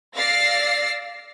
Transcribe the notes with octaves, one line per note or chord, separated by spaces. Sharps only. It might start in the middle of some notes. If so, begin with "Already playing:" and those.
D5 F5 E6 A6 A#6 C7